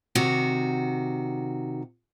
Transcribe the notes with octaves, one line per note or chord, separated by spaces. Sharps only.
C3 D#3 F#4